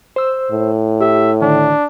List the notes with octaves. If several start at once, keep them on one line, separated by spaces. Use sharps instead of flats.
C5 E6
A2
G4 E5
D3 D#3 D4